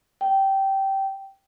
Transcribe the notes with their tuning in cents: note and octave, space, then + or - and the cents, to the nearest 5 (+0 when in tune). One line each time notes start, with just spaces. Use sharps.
G5 -15